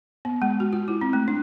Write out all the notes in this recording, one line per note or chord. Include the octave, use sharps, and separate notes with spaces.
B3
G#3
F#4
F4
E4
C4
A3
D4